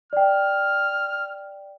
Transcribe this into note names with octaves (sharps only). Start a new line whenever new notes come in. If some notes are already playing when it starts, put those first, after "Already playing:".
D5 G5 F6